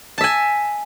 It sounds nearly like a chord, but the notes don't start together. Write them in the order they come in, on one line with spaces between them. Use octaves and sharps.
A5 E5 G#5